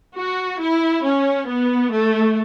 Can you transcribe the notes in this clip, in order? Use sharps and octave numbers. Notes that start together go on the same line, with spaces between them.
F#4
E4
C#4
B3
A3